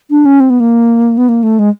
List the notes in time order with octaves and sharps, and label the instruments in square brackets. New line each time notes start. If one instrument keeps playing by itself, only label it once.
[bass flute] D4
C#4
C4
B3
A#3
B3
A#3
A3
G#3